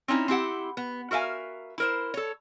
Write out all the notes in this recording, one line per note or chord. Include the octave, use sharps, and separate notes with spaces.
C4 C#4 D#4 E4
C4 E4 G4 F#5
B3
F#4 A#4 E5 F5 G#5
E4 A#4 C5
A4 C#5